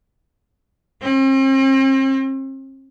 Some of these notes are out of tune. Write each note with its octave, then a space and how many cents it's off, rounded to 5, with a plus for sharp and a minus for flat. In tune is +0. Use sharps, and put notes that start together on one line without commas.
C4 +40